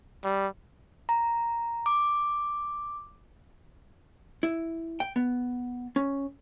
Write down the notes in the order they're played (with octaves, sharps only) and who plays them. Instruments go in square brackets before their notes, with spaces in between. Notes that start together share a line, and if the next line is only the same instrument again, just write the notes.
[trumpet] G3
[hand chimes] A#5
D6
[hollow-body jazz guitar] E4
G5
B3
C#4